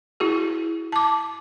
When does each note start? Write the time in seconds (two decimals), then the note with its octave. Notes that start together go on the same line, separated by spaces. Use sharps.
0.20 E4 F#4 G#4
0.92 A5 D6